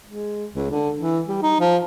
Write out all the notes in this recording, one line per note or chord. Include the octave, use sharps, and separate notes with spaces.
G#3
C#2
D3
E3
G3
D#4
F3